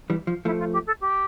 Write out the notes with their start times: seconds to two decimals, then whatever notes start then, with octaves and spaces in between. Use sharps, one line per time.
0.10 E3 G3
0.27 F3
0.45 F3 A3 E4
0.59 F4
0.73 G4
0.86 A4
1.01 G4